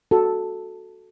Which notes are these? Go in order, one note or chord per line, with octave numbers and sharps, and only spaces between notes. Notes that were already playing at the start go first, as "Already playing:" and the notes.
F#4 A4